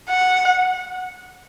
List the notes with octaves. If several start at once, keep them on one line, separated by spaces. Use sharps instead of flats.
F#5